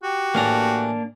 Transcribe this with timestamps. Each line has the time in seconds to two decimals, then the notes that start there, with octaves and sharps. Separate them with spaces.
0.03 F#4 G4
0.35 A2 E3 A#3 D4 A#5